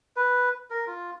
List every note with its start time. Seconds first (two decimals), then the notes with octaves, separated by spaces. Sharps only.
0.16 B4
0.70 A#4
0.87 F4